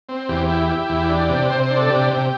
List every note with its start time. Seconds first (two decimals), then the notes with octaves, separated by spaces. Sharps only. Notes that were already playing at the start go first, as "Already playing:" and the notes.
0.09 C4
0.29 E2 G4
0.49 E4
0.69 E4
0.89 E2
1.09 D4
1.29 C3
1.50 C3 C5
1.63 C5
1.70 D4
1.77 A4
1.90 C3 G4
2.10 C3